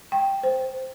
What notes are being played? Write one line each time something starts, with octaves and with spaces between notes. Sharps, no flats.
G5
C5